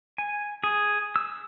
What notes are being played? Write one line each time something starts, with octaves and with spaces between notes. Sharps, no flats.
G#5
G#4
E6